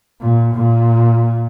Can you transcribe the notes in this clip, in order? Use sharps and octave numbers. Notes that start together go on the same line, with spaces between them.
A#2
A#2